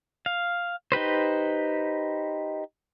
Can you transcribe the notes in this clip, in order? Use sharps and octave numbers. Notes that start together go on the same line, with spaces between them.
F5
D#4 G4 B4 C5